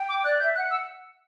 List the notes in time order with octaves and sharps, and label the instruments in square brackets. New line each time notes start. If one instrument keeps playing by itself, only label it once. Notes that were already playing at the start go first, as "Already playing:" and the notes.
Already playing: [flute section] G5
[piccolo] D6
[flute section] D5 [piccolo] F#6
[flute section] E5 [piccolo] G6
[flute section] F#5 [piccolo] F#6
[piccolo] E6